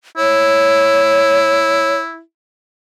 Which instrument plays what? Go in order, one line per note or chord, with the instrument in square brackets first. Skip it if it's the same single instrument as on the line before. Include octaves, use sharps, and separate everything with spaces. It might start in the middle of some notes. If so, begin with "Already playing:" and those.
[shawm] E4 [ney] C#5